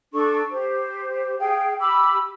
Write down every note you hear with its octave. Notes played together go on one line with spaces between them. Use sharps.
D4 A4 C#6
G4 C5
G#4 F5 G5
G4 B5 D6 E6